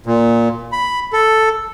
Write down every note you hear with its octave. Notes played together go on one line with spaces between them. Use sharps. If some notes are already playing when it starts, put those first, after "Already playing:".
A#2
B5
A4